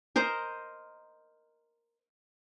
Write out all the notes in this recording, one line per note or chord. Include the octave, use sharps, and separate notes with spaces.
A#4 C5 D#5 A#5